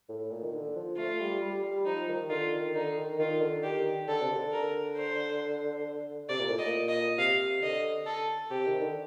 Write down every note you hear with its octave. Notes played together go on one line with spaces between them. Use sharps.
A2
A#2
D#3
D3
F3
A3 F4
G3
G3
G3
F3 D#4
D#3
D3 F4
D#3
D3 D#4
D#3
D#3 F4
D3
D#3 G4
D3 A4
C3
D3
A#4
C5
C3 D5
A#2
A2
A#2 D#5
D#5
C3 F5
D3 D#5
A4
C3 G4
D#3
D3